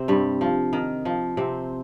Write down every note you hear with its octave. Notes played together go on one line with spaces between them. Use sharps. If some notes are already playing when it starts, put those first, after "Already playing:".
Already playing: C3 C4
G2 G3
F3
D#3
F3
C3 C4